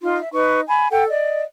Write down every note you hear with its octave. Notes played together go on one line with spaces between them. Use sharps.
D#4 F4 C6
E5
D#4 B4 C#6
G#5 B5
A4 F#5 G5
D5 D#5